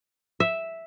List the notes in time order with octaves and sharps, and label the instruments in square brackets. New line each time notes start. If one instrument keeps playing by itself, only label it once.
[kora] E5